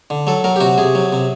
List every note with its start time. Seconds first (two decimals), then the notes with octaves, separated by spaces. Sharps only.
0.10 D3
0.27 F#3 A4
0.44 F#3 A#4
0.56 G4
0.61 C3 F#4
0.78 C3 G#4
0.95 F#3
1.13 C3